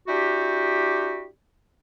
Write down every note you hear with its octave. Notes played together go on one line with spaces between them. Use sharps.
D4 E4 F#4 G4